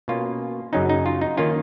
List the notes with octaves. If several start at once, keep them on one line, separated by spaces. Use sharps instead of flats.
B2 A#3 C#4 F4
F#2 C#3 F#3 C#4 D#4
D#4
F4
D#4
D#3 A#3 C#4 F4